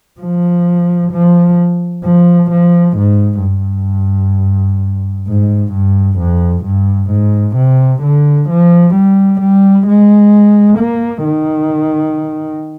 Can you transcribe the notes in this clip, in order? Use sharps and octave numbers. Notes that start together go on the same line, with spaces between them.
F3
F3
F3
F3
G#2
G2
G#2
G2
F2
G2
G#2
C3
D3
F3
G3
G3
G#3
A#3
D#3